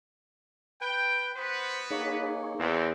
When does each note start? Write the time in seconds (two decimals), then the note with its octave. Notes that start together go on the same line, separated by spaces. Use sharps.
0.81 B4 G5
1.36 B3 F#4 B4 C5
1.91 A#3 D#4 G#4 C#5
2.59 E2 C4